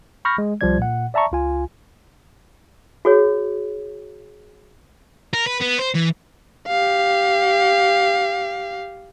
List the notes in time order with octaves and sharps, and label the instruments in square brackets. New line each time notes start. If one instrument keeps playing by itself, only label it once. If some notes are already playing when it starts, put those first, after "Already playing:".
[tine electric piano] B5 C#6 F6 G6 A#6
G#3
C2 F3 G3 D5 G#6
A#2 F#5
D5 E5 A5 A#5 C#6
C#2 F4 G#5
[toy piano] F#4 G#4 C#5
[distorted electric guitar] A#4
B4
B3
C5
E3
[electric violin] G4 F5